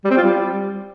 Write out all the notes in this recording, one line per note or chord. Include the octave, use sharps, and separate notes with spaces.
G3
C4
F4
G3